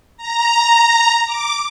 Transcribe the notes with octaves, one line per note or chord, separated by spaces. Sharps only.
A#5
D6